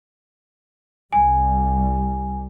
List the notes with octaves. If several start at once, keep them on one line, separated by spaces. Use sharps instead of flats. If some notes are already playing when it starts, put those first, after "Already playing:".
C2 G3 G#5